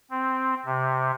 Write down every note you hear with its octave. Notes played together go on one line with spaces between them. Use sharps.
C4
C3